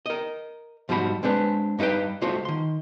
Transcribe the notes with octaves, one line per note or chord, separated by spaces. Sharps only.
A#4 D#5
G#2 F3 G3 F#4 B5
G#3 C4 D4 B4
G2 D#4 E4 B4 G5
C#2 A3 F4 F#4 C5
D#3 C6